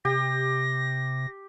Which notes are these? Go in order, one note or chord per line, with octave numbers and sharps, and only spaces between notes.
C3 G4 A#6